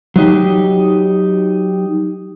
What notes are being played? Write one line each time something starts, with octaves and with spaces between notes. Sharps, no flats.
F#3 D#4 G4